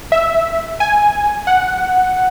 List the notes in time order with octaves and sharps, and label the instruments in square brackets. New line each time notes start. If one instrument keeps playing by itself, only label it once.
[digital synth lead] E5
G#5
F#5